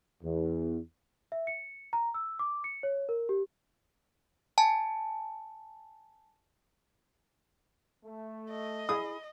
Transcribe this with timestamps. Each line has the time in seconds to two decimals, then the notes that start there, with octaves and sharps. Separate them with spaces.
0.24 E2
1.32 E5
1.47 C#7
1.93 A#5
2.14 E6
2.39 D6
2.64 C#7
2.83 C#5
3.09 A#4
3.29 G4
4.58 G#5 A5
8.05 A3
8.50 D#5
8.89 E4 G#4 D#6